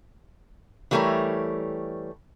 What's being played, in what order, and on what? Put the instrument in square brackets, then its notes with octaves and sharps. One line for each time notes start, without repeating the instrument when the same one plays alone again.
[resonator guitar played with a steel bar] E3 G3 A3 G4 A#4 C#5